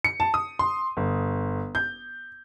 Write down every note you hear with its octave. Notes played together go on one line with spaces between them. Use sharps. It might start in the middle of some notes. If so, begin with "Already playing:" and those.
C#7
A5
D#6
C6
G1
G6